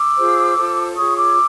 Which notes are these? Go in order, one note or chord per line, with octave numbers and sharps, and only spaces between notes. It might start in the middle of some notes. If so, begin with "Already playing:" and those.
Already playing: D6 E6
F4 G#4 C5
F4 A4 C5
F4 G#4 C#5 C#6 D#6
D6 E6